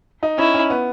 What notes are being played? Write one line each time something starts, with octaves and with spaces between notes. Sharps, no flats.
D#4
C#4 E4
C#4
B3